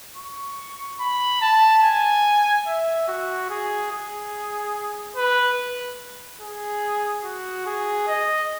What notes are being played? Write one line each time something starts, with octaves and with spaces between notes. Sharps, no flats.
C#6
B5
A5
G#5
E5
F#4
G#4
G#4
B4
G#4
F#4
G#4
D#5